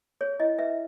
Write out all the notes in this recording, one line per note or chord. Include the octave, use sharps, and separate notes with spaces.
G#4 C#5
E4 D#5
B4 E5